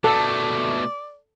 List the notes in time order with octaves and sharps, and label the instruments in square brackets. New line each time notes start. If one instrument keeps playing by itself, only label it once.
[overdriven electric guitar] B2 A3 [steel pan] A4 [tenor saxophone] D5